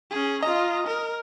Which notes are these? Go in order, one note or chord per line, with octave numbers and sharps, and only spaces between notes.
C#4 G#4
F4 D#5 A#5
A#4